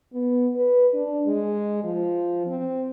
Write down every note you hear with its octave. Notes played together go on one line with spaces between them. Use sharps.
B3
B4
D4
G#3
F3
C4